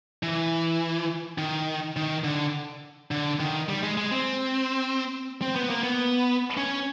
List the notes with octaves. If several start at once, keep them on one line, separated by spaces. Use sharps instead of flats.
E3
D#3
D#3
D3
D3
D#3
G3
G#3
G#3
C4
C4
B3
A#3
B3
C#4